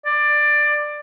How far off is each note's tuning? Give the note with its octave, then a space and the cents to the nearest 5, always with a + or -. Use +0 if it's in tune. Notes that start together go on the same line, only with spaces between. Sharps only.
D5 +15